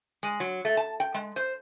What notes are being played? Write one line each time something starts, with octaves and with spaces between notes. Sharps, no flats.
G#3
F#3
A3
A5
G5
G#3
C5